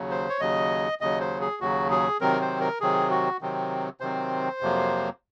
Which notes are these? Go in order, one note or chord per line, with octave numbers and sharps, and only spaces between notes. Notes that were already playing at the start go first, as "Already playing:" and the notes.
Already playing: D#2 C#3 F#3
C5
C#5
D#2 C#3 F#3 D#5
D#2 C#3 F#3 D#5
C5
G#4
D#2 C#3 F#3 F#4
G#4
C3 D#3 F#3 C4 A#4
C5
A#4
C3 D#3 F#3 C4 G#4
F#4
C3 D#3 F#3 C4
C3 D#3 F#3 C4 C5
F2 C3 F#3 A#3